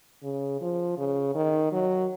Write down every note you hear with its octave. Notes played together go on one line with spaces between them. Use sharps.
C#3
F3
C#3
D#3
F#3